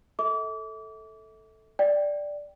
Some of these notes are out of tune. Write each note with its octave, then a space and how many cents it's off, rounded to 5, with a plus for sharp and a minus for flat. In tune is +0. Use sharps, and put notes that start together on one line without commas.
A4 +0 E5 -35 D6 -35
D5 +0 G5 +0